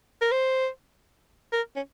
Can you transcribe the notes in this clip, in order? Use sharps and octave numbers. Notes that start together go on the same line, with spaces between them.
A#4
C5
A#4
C#4